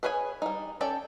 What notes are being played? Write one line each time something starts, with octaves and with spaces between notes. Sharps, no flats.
G#4 B4 C#5 D#5 G#5
G3 D#4
C#4 A4 D5 G5